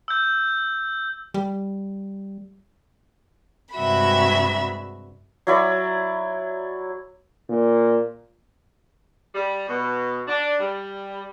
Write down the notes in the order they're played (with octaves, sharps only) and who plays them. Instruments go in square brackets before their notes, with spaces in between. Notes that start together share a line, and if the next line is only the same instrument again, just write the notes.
[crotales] E6 G6
[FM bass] G3
[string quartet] G2 C3 G#3 F#4 E5 B5
[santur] F#3 E4 D5
[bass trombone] A#2
[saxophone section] G3
B2
D4
G3